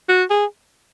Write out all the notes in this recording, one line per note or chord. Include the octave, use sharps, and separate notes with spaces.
F#4
G#4